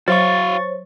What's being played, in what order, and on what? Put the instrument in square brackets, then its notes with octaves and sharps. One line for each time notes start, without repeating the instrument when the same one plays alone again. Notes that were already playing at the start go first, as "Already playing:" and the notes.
[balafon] F#3 [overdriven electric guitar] F#4 F5 [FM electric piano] C5 C#5 [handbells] C#6 A6